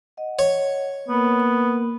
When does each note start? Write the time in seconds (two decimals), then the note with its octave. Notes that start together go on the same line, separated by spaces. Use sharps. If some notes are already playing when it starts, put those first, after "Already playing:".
0.17 D#5 F#5
0.39 C#5
1.08 A#3 B3 A#4